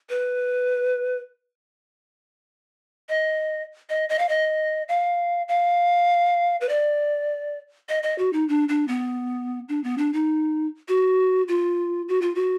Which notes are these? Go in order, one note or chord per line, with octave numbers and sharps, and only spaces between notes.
B4
D#5
D#5
D#5
F5
D#5
F5
F5
B4
D5
D#5
D#5
F#4
D#4
D4
D4
B3
D4
B3
D4
D#4
F#4
F4
F#4
F4
F#4